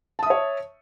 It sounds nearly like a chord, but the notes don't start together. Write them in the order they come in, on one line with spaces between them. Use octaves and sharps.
A5 D#6 E5 C#5